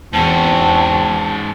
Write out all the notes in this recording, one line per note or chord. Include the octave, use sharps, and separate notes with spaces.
E2 G#2 C4 C#4 F#4 A5